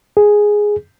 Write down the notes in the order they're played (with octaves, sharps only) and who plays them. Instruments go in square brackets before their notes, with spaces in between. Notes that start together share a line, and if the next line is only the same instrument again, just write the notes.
[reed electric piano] G#4